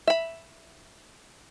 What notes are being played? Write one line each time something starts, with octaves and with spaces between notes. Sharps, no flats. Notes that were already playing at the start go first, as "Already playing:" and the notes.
E5 B5